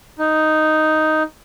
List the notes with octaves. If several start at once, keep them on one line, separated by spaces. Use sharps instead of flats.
D#4